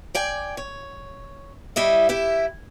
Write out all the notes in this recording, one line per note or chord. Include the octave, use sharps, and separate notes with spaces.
D5 G5 G#5
C#5
G3 E4 D#5 E5
E4 G4 E5